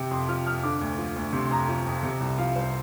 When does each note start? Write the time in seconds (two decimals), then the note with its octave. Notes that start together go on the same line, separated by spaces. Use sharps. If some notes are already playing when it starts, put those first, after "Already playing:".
Already playing: C3 G5
0.11 F2 C6
0.28 F3 F6
0.46 F2 F6
0.63 D3 D6
0.81 D2
0.98 F3
1.16 D2
1.33 C3 C6
1.45 C6
1.51 F2 A#5
1.68 F3
1.86 F2
2.03 C3
2.20 C2
2.38 F3 F5
2.56 C2 C5